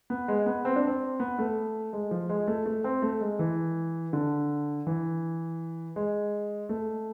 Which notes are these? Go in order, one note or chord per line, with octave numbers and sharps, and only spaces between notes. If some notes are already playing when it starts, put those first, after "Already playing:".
B3
G#3
B3
C4
D4
C4
B3
A3
G#3
F3
G#3
A3
A3
C4
A3
G#3
E3
D3
E3
G#3
A3